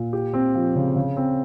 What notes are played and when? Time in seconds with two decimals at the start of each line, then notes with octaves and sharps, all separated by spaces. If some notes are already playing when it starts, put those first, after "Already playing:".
Already playing: A#2
0.13 G4
0.33 C4
0.55 F3
0.75 C#3
0.96 C#3
1.17 C4